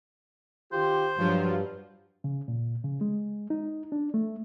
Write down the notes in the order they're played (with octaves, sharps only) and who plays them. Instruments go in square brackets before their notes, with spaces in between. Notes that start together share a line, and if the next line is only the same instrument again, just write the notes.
[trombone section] D#3 F4 G4 [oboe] C5
[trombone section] G2 [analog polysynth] F3 F#3 F4
[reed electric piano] C#3
A#2
C#3
G#3
D#4
D4
A3